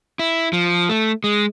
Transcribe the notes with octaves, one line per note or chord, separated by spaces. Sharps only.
E4
F3
A3
G#3